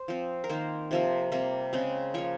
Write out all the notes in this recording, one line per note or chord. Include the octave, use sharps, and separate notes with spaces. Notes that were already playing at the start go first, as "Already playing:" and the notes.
Already playing: C5
F3 C4
A#4
D#3 A#3 C5
C3 F3 A#3
C3 G3 A#3
C#3 G#3 C4
F3 A#3 C#5